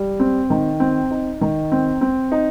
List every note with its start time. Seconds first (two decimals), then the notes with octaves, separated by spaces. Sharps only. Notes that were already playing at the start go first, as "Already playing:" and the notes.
Already playing: G3
0.20 C4
0.50 D#3
0.80 C4
1.11 D#4
1.41 D#3
1.72 C4
2.01 C4
2.32 D#4